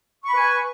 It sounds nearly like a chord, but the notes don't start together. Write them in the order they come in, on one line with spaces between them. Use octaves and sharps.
C#6 B5 B4 G#5